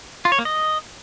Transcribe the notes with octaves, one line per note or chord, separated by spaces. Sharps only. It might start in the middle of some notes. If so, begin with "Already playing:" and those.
F4
C#5
A#3
D#5